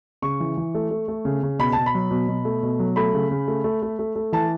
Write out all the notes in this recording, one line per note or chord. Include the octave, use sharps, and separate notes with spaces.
C#3 C#6
E3
E3
A3
A3
A3
C#3
C#3
B2 B5
B2 A5
B5
F#3
B2
B2
A3
B2
F#3
A3 B5
C#3
C#3
A3
A3
A3
A3
A3
E3 A5